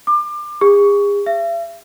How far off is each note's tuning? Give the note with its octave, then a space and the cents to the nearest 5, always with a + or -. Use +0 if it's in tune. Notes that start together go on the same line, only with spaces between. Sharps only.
D6 +30
G#4 -40
E5 +45